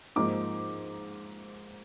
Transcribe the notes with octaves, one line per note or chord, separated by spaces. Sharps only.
G#2 F3 A#3 D#4 D6